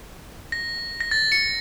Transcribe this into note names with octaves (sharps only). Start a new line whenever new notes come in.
A#6
A#6
A6
C#7